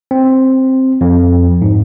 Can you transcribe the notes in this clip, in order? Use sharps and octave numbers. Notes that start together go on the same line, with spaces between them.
C4
F2
G#2